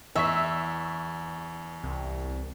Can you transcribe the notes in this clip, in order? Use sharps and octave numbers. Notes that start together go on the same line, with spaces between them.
E2 E5 C#6 B6
C2